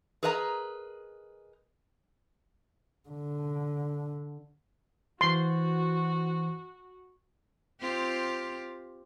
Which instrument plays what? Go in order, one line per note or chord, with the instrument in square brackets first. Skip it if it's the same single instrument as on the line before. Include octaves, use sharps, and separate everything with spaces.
[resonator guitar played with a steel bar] G#4 A#4 B4 D#5 F#5 A#5
[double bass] D3
[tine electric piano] E3 C5 A6 [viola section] F#4 [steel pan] C6
[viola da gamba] C4 F4 G4